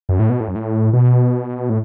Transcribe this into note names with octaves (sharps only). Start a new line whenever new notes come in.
F#2
A2
B2
A2
F#2
A2
B2
A2